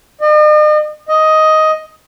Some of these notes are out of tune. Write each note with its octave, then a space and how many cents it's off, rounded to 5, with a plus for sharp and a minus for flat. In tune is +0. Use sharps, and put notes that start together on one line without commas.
D#5 -45
D#5 +10